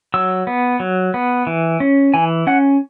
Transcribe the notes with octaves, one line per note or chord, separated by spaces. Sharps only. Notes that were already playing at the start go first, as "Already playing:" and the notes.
F#3 E6
B3
F#3
B3
E3
C#4
E3 G#5
C#4 F#5